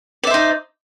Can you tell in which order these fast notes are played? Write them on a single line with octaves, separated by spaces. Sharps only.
D5 E5 C5 D#4